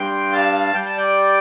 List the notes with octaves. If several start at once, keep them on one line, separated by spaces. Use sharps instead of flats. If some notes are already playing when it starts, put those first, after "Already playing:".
Already playing: G2 G5 C6
G3 F5 A5
G3 G5
A5
D5 G5